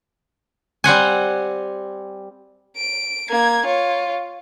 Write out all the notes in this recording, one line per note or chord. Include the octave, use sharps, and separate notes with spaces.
G3 C4 F#5 G#5
D7
A#3 G#6
F4 C#5